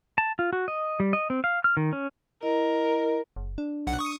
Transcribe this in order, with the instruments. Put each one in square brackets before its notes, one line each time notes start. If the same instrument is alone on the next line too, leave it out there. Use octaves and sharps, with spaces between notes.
[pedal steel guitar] A5
F4
F#4
D#5
G3
D#5
C4
F5
F6
D#3
C#4
[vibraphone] E4 D#5 [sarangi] A#4
[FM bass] F#1
D4
[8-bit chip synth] B1 F#5
C#6 D#6